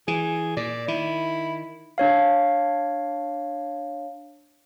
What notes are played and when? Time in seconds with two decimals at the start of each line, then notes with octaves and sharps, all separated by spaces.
0.08 E3 G#4
0.57 A#2 D5
0.88 D#3 E4
1.98 D4 C#5 F5